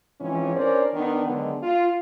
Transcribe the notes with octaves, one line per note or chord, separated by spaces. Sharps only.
G#2 E3 F3 C4 C#4
C#4 D4 A#4 C5 D5
D#3 B3 D4
D3 D#3 F#3 G#3 B3
F4